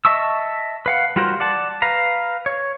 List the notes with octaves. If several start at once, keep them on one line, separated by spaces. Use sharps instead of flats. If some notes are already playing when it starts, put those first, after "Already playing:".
D#5 E5 A5 C#6 E6
B4 F5 F#5
G3 F4 F#4 A#4 C5
D5 F#5 A5
B4 F5 A#5
C#5